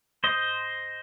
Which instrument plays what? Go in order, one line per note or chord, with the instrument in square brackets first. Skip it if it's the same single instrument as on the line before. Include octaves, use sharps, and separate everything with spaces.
[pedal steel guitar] C5 D#5